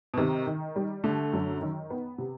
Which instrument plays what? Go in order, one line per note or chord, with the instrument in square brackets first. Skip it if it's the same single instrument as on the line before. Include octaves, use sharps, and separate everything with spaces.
[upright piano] B2
[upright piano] C3 [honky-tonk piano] D#3
[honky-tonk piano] D#3
G3
[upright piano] D3 [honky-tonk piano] A3
[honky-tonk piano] F#2
D#3
B3
C3